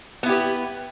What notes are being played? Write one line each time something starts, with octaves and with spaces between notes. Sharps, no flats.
B3 E4 G4 B4